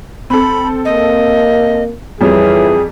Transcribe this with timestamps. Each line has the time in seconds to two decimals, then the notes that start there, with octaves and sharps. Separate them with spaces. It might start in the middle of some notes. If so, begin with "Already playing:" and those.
0.30 C4 A4 B5
0.85 A#3 D#5
2.21 F2 E3 G3 G#4 C#5